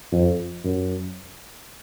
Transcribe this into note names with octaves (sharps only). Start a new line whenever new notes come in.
F2
F#2